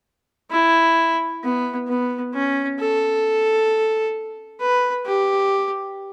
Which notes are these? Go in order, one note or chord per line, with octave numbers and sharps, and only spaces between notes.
E4
B3
B3
C#4
A4
B4
G4